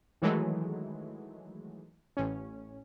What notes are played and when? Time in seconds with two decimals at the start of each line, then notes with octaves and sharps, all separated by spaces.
0.22 D#3 E3 F#3 G#3 A3
2.17 A1 C#4